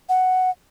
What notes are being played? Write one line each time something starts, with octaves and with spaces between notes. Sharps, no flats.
F#5